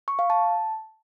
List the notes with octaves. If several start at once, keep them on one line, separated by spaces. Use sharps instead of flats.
C#6
F5
A5